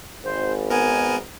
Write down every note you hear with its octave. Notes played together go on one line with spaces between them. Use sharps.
G#1 C5
B3 A#4 G#5